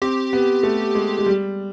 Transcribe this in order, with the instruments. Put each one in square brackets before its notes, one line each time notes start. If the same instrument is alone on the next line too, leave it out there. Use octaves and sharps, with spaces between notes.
[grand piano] C4 [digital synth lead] G4
[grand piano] B3
A3
G#3
G#3
G3